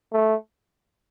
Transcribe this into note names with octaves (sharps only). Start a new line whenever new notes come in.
A3